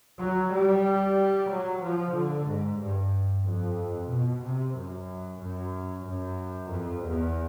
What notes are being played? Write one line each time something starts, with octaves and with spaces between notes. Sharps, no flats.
F#3
G3
F#3
F3
D3
G#2
G2
F2
B2
C3
F#2
F#2
F#2
F2
E2